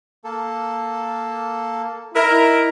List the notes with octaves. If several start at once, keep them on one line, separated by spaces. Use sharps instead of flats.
A#3 A4
D#4 E4 A#4